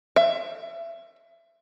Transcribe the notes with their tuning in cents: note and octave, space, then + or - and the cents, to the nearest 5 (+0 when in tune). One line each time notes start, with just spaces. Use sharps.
E5 +25